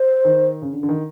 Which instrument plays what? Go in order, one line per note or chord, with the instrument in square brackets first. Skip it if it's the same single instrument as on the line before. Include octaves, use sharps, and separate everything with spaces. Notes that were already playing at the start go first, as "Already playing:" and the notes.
Already playing: [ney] C5
[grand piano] D#3
C#3
D3
D3
D#3